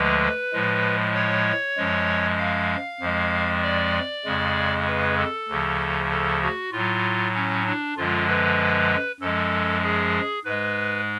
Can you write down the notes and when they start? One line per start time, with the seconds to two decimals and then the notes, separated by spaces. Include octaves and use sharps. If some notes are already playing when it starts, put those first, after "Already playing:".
Already playing: D2 D3 F3 G#3 B4
0.53 A2 F3 G#3
1.14 C#5
1.77 F#2 F3 G#3
2.38 F5
3.01 F2 F3 G#3
3.62 D5
4.25 F2 C#3 G#3
4.87 B4
5.17 A4
5.49 D2 C#3 F3
6.11 A4
6.42 F#4
6.72 A2 F#3 F4
7.35 C#4
7.66 D4
7.97 F#2 D3 F3 G#3 F4
8.28 B4
9.21 F#2 F3 G#3 A4
9.83 G#4
10.45 G#2 G#3 B4